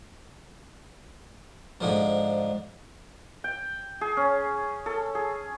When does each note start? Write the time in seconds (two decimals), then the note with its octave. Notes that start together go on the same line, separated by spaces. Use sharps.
1.81 G#2 D3 F3
3.44 G5
4.01 G#4
4.17 C#4
4.86 A4
5.15 G#4